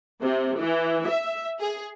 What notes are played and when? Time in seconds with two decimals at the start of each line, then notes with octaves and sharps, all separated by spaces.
0.21 C3
0.60 E3
1.08 E5
1.60 G#4